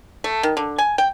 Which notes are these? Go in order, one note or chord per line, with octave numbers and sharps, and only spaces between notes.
A3
D#3
D3
G#5
G5